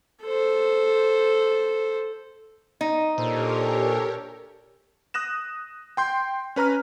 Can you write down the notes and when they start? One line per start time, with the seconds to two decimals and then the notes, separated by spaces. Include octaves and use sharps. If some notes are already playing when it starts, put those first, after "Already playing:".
0.24 A4 C5
2.81 D#4
3.18 A#2 D4 G4 A4 A#4 C5 C#5
5.14 D#6 F#6 A#6 E7
5.97 G5 C6 G6
6.56 C#4 B4 A#5 F6